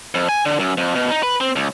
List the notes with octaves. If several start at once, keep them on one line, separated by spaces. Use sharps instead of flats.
F2
G#5
D3
F#2
F2
B2
D#4
B4
C4
C#2